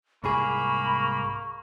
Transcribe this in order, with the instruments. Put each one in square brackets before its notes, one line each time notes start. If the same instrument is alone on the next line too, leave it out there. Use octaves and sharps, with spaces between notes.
[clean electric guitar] C2 G#2 G#4 [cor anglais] A#3 [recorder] B5 [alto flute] C#6